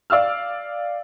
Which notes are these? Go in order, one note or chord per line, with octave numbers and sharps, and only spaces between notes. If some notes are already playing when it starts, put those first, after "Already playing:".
D5 F5 E6 F6